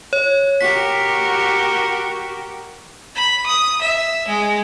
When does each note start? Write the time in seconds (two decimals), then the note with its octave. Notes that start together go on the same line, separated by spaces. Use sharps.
0.13 C#5
0.61 F#4 G4 A#4 B6
3.15 B5
3.46 D#6
3.81 E5
4.28 G#3